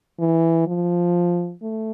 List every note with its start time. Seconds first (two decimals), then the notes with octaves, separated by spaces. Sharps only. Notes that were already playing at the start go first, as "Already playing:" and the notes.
0.19 E3
0.67 F3
1.63 A3